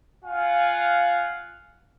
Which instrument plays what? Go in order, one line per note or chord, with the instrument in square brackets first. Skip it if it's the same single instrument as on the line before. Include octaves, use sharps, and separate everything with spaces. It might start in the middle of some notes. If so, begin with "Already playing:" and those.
[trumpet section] F4 F5 F#5 G#5